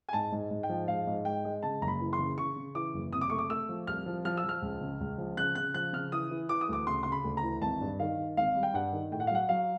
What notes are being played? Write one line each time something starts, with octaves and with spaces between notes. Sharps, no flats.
G#5
G#2 A5
G#2
G#2
G5
F3
G#2 F5
G#2
G#3 G5
G#3
C#3 A5
F#1 A#5
B5
E3
C6
C#3
C#3 C#6
C#3
E3 D6
F#1
C3 D#6
D6
A3 C#6
D6
A3 E6
F3
C2 F6
F3
F3 F6
E6
F3 F6
C#2
C#3
C#2
F3
C#3 F#6
C#3 F#6
F3 F#6
C#3 F6
E3 D#6
E3
E3 D6
D#6
D2 D6
C#3 C6
C#3 C6
B5
D2
A#5
E3
G#1 A5
G2
D#3 F5
D#3
G#1 F5
G3
G5
G2 F#5
D#3
A2 G5
F#5
F5
F#3 F#5
F#3 F5